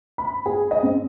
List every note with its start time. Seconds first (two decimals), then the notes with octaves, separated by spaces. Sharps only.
0.18 B5
0.46 G#4
0.71 D#5
0.83 C4